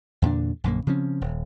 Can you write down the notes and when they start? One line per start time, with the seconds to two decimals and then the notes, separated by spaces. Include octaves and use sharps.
0.22 E2 A#2 D3 D4
0.64 A#1 F#2 D3 A#3
0.87 C#3 F3 C4 C#4
1.21 D#1